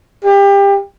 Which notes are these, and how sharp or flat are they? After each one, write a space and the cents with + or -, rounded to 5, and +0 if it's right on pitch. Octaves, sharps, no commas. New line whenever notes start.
G4 +25